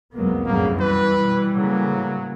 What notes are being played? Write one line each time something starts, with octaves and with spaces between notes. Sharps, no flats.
C2 F2 F#3 G#3 A#3 B3
F#2 A2 C#3 A#3
E3 G3 B4
B2
A2 C#3 F#3 A#3